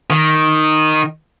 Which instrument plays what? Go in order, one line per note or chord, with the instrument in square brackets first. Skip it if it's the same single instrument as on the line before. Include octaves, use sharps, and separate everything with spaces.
[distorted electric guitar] D#3